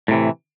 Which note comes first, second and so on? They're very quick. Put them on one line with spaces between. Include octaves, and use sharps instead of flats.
A2 C3 E3